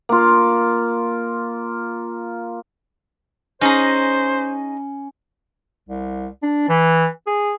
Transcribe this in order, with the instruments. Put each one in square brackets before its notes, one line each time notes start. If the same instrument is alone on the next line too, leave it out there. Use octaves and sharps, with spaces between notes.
[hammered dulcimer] A#3 F4
[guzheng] C#4 [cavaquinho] D#4 G#4 A#5 [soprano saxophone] C5
[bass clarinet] C2
D4
E3
G#4